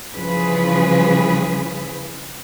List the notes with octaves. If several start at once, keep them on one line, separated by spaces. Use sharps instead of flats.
C#3 E3 F3 G3 G#4 B4